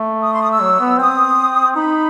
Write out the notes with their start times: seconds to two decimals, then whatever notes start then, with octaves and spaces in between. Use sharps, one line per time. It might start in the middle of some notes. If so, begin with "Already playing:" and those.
Already playing: A3
0.23 D#6
0.33 C6
0.41 D#6
0.52 E6
0.61 F#3
0.81 B3
0.99 C4 D#6
1.76 D#4 B5